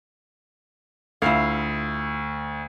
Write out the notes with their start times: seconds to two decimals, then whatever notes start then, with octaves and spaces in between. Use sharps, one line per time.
1.22 D2 E4 F4 F5